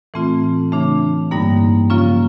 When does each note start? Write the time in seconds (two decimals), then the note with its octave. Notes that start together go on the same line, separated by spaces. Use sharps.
0.14 A2 E3 A3 C4 F4
0.72 C#3 E3 A3 D4
1.31 G2 D3 G3 A#3 D#4
1.90 C#3 F3 A#3 C#4 F4